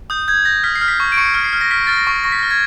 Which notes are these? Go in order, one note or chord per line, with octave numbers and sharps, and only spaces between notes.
D#6 G6
G6 G#6
G6 A#6
F6 B6
C7
F6
B6
C#6
D7
C#6 C#7
F6
C7
F6
A#6
F6 B6
F6 A6
A#6
C#6
C#6 A#6
B6
F6 A#6
G#6